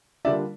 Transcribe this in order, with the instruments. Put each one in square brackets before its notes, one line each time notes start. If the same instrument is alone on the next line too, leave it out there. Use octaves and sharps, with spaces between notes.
[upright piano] D3 G3 A#3 D4 F4 D5 E5